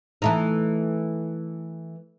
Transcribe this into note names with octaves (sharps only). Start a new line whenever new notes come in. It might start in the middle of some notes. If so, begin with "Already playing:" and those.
E3 A3 D#4